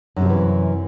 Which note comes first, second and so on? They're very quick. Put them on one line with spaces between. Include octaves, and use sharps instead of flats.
F#2 C3 F3 E3